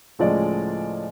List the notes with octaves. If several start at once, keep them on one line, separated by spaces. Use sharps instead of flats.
C#2 A2 F3 G#3 D5 D#5